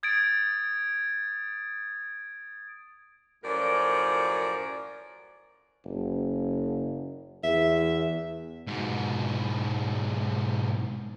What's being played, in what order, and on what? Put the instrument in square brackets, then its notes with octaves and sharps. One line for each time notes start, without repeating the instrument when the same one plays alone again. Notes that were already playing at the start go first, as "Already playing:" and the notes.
[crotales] D#6 G#6 A6 D7
[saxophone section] F#2 A2 F3 F#3 A#4 D5
[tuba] F#1
[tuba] E2 [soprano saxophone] E5
[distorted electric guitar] G#2 B2